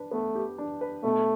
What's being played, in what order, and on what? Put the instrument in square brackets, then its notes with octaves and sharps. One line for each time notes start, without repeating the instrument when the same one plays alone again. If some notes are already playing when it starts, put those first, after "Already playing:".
Already playing: [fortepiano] D4 B4
[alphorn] A3 [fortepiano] B3
[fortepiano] G4
D4
B4
[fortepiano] B2 [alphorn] A3